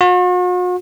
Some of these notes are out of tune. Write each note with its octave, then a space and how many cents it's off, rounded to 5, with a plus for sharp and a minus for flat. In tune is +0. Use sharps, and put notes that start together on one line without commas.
F#4 -45